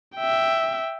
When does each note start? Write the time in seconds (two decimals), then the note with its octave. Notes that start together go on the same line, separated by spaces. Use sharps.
0.16 E5 G5